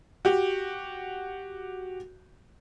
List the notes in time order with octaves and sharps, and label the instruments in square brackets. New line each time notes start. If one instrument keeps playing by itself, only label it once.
[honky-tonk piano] F#4 G4